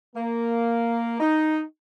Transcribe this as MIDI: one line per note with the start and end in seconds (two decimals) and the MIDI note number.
0.16 1.19 58
1.19 1.61 63